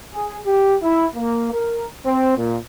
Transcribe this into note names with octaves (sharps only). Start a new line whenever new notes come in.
G#4
G4
E4
A#3
A#4
C4
A#2